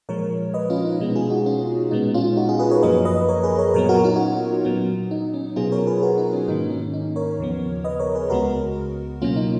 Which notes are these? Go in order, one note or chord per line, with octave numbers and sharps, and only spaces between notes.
A#2 F3 G#3 A#4 C#5
B4 D#5
C#4 F4
D#4
B2 G#3 B3 D#4
F4 G#4
D#4 F#4
C#4 F4
A#2 G#3 B3 D#4
C#4 F4
D#4 F#4
F4 G#4
G#4 B4
A#4 C#5
F#2 F3 A#3 B4 D#5
B4 D#5
A#4 C#5
G#4 B4
A#4 C#5
A#2 F#3 B3 A#4 C#5
F#4 A#4
D#4 F#4
F#4
C#4 F4
A#2 F#3 B3
D#4
C#4
B2 F#3 B3 F4 G#4
A#4 C#5
G#4 B4
F#4 A#4
D#4
C#4
G#2 D#3 A#3 D#4
C#4
D#4
A#4 C#5
D#2 C#3 F3 B3
B4 D#5
A#4 C#5
G#4 B4
C#2 C#3 G#3 B3 F#4 A#4
B2 F#3 A#3 C#4 F4
D#4